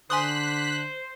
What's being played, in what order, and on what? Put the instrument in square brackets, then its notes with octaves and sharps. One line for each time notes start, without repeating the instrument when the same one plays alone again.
[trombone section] D3 [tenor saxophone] C5 [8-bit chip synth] G#5 C6 D#6 [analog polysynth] F#6 B6